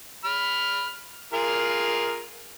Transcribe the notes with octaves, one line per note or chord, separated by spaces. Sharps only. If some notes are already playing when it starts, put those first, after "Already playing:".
B5 F6
F4 G#4 A#4